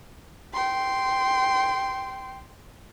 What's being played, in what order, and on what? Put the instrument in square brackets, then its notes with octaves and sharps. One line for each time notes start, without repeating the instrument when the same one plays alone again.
[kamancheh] G5 C6